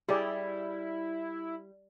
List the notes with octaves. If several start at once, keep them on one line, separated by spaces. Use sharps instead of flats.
G3 E4 G4 G#4 D5